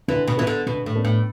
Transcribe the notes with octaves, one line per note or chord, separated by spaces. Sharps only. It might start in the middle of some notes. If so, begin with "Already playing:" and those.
D3 E3
B2
E3 B3 D4 A4
D3
B2 D3
A2
B3 D4 A4
A2